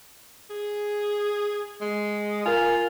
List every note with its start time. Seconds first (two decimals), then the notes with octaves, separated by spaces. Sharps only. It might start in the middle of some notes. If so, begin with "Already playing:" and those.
0.50 G#4
1.81 G#3
2.46 F4 A#4 G#5